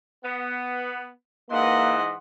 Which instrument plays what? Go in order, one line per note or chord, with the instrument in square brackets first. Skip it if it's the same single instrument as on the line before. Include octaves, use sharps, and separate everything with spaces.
[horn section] B3
[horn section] G#2 E3 [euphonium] A#3 [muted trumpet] D#5 [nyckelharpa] F#5 C6